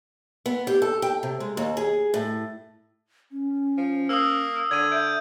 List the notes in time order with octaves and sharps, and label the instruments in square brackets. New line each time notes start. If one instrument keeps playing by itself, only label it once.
[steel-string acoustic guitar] B3
G4
A4
G5
C3
G#3
D#2
G#4
A2
[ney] C#4
[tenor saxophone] F3
[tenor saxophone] A#3 [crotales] D#6 E6
[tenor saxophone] D3 [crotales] G#6 D#7
[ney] E5 [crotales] G6 D7